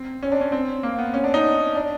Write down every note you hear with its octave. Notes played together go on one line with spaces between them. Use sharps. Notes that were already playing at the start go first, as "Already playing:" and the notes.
Already playing: C4
C#4
D4
C#4
C4
A#3
B3
C#4
D4
D#4
D4